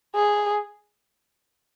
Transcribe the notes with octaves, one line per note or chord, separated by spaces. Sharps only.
G#4